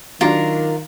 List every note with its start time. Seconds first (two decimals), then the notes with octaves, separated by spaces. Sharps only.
0.21 D#3 F#3 D4 F4 A#4